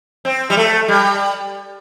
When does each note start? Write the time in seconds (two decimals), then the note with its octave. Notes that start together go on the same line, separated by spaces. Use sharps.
0.25 C4
0.50 G3
0.57 A3
0.88 G3